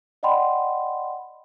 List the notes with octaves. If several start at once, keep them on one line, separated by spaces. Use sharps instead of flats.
D5 D#5 F#5 G5 B5 C6